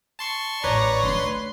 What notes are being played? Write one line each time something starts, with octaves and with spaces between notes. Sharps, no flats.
A5 C6 C#6
A1 B4 C#5 D5 A#5 C#6
D3 A3 C6